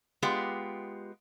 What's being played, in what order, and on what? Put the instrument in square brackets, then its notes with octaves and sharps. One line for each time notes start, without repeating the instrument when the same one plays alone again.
[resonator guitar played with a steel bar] G#3 B3 F4 G4